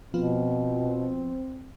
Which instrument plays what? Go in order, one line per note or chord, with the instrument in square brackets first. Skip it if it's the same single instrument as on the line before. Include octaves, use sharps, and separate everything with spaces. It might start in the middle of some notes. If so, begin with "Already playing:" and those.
[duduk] B2 [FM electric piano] F3 B3 F4 [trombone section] C4